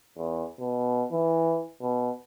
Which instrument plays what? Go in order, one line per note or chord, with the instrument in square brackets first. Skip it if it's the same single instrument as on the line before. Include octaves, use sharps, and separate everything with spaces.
[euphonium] E2
B2
E3
B2